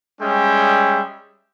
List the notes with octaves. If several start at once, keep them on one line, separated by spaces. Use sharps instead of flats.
G3 G#3 C#4 E5 G5